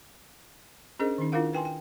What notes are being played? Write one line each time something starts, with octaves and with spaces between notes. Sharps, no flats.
C#4 D4 G#4 A#4 C5 D#5
D#3 C#4 D#4
D4 E4 F4 A#4 F5 F#5
B4 G5 G#5 C6
G5